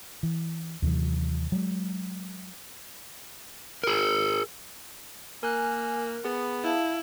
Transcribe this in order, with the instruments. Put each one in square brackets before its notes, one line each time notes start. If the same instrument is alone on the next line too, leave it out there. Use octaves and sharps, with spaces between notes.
[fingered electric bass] E3
D#2 C3 E3 F#3
F#3 G#3
[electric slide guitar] G#4 A#4
[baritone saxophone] A#3 [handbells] A#4 F#6 [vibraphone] G#5
[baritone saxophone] B3 [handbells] G#4 [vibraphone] B5
[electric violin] E4 [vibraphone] F5 A5